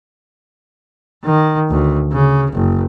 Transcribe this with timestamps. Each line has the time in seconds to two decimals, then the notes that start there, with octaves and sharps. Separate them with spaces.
1.25 D#3
1.70 D2
2.12 C#3
2.52 F#1